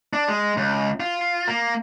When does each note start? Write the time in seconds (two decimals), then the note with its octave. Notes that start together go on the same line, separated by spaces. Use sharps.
0.13 D4
0.28 G#3
0.57 C#2
1.00 F4
1.47 A#3